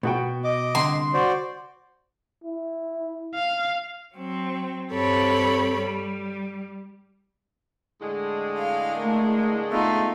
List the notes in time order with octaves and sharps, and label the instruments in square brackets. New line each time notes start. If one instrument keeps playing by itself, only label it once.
[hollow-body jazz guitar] B2 [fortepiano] B3 F#4 G5
[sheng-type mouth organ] D#5 D6
[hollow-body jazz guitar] C2 D3 [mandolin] C6
[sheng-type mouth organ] F#4 C5 D5
[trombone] E4
[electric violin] F5
[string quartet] F#3 C4
G2 C4 G4 A4 C#5 B5
G3
[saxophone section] A2 D3 G#3
[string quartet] F5
[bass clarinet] A3 [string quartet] A#3
[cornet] A3 [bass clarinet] B3 [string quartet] D#4 F4